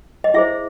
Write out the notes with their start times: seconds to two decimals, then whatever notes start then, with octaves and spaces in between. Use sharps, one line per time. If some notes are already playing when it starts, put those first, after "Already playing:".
0.24 D#5
0.34 E4 G#4 C5 E5